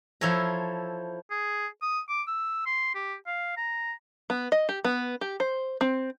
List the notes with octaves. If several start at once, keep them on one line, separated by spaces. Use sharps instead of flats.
F3 E4 A4 C#5 A#5
G#4
D#6
D6
E6
C6
G4
F5
A#5
B3
D#5
G4
B3
G4
C5
C4